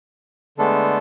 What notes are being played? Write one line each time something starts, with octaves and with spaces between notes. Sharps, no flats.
D3 G#3 A3 B3 D4 A4